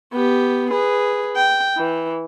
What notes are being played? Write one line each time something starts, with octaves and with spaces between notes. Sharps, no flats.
B3 G4
G#4 B4
G5
E3